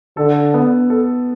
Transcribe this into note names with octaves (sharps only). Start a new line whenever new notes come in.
D3 A4
B3
A4